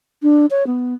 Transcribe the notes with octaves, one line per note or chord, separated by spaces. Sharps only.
D4
C#5
B3